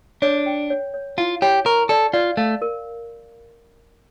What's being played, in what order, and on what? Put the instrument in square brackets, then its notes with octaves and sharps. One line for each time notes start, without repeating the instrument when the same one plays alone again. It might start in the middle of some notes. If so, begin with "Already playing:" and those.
[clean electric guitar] D4 [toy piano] C#5
[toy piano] G5
C#5
C#5
[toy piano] E4 [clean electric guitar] F4
[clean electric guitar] G4 [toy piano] C#5
[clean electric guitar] A#4 [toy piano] C#6
[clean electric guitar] A4 [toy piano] D5
[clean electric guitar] F4 [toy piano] D5
[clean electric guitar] A3 [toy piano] F5
[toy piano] A#4